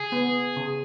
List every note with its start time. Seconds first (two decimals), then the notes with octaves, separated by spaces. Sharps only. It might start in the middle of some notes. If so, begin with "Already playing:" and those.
Already playing: C#3 G#4
0.12 B3
0.56 C#3